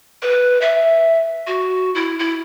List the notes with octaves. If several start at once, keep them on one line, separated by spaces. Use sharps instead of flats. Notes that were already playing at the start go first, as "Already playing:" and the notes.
B4
E5
F#4
E4
E4